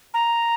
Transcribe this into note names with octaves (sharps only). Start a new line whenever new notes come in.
A#5